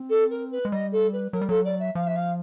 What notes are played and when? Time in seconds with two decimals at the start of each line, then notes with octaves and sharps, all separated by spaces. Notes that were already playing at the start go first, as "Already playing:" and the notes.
Already playing: C4
0.10 A4
0.30 A#4
0.51 B4
0.65 G#3
0.72 G3 D#5
0.92 A4
1.13 B4
1.33 F#3 A#4
1.41 G3
1.49 F#3 A4
1.65 D5
1.79 E5
1.95 F3 F5
2.06 E5
2.16 F5